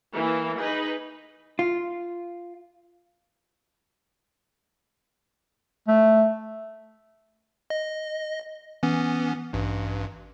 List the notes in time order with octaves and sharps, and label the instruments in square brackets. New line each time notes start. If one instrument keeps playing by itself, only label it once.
[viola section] E3 A#3 F5
D#4 G#4 B4
[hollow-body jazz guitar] F4
[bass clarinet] A3
[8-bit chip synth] D#5
E3 B3 C#4
A1 G2